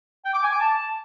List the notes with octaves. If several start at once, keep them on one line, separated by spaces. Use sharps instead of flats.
G5
D6
G#5
D6
A5